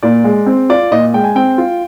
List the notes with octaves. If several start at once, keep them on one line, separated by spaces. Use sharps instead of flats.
A#2 D5
G#3
C4
F4 D5
A#2 D#5
G#3 G5
G#5
C4 G5
F4